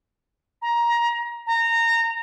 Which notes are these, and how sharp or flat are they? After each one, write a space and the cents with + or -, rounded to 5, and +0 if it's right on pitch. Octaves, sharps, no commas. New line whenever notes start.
A#5 +20
A#5 -20